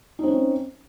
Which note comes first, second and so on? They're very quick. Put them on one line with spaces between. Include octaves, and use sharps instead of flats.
D#4 C4 C#4